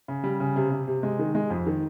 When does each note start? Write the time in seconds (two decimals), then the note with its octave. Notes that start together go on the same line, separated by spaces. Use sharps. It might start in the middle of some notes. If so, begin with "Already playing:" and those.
0.08 C#3
0.24 G3
0.40 C#3
0.56 C3
0.72 C3
0.88 C3
1.03 G#3
1.19 D#3
1.35 G#3
1.50 F2
1.67 D#3